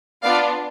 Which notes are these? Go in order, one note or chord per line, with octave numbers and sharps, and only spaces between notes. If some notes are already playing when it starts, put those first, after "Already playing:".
B3 D4 F4 D5 F5